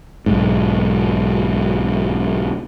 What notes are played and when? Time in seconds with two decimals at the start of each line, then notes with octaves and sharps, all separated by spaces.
0.26 B1 G#2